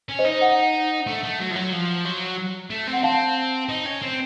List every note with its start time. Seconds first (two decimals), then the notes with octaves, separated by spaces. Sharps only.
0.09 C#4
0.19 C5 D#5
0.25 D#4
0.41 D#5 F#5
1.07 A3
1.23 A3
1.39 F#3
1.51 F3
1.56 F#3
1.72 F3
2.05 F#3
2.71 A3
2.87 C4
2.93 F#5
3.03 C4 F5 A5
3.69 D#4
3.86 C#4
4.02 C4